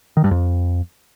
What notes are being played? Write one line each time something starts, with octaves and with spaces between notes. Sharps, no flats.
D#3
G2
F2